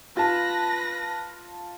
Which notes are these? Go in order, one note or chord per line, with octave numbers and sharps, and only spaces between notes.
F4 B4 A5 A#6